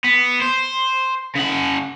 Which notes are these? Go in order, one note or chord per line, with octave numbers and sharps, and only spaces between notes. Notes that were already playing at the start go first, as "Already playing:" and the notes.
B3
C5
C#3 F#5